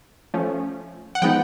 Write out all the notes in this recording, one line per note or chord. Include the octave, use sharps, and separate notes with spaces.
F3 A3 C#4
F#5
F3 G#3 B3 D#4 G5